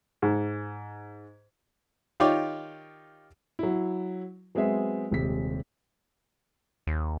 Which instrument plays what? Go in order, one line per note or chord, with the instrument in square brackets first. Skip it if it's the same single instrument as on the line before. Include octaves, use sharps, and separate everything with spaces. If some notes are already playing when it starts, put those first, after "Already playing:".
[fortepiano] G#2
D#3 D#4 F4 G4 C#5 D5
[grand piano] F#3 E4
F#3 G#3 B3 C4 G#4 E5
D#1 C3 G#3 B6
[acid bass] D#2